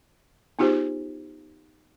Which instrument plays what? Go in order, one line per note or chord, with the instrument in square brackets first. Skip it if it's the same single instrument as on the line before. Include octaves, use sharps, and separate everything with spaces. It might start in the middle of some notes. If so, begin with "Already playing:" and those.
[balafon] B3 D#4 F4 G4 G#4 C5